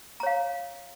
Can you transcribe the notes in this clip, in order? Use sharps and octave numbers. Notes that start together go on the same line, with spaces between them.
C#5 F5 A#5